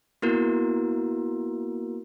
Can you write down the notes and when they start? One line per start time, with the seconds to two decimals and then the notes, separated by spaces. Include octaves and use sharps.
0.22 A#3 B3 E4 F#4 A#4